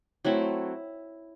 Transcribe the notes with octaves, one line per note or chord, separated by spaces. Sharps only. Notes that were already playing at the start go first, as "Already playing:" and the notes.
F#3 A3 C4 E4